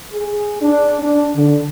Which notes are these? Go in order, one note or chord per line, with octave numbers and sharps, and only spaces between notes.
G#4
D4
D4
D3